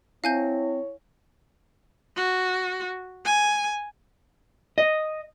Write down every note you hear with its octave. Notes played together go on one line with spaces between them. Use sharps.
C4 E4 C#5 F5 G#5 G6
F#4
G#5
D#5